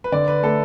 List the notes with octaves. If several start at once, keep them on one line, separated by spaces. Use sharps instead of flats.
B4
D3 D5
B4
A3 A4